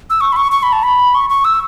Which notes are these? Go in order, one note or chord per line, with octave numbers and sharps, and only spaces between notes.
E6
C#6
B5
C#6
C#6
B5
A5
B5
C#6
C#6
E6